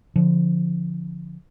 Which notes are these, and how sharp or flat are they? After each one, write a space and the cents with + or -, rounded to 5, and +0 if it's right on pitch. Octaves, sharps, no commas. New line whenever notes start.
D3 -10 F3 +0